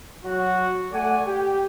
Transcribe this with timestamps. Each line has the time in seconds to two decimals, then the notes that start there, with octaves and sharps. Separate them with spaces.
0.24 F#3 F#4
0.92 A3 D5 F#5 G#5
1.26 G4